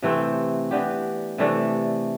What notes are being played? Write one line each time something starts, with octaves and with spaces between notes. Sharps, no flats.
C3 E3 A3 C4
E3 B3 D4 G4
C3 E3 A3 D4